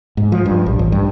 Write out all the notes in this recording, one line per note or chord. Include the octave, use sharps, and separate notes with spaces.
G#2
F3
G2
A#1
A1
G2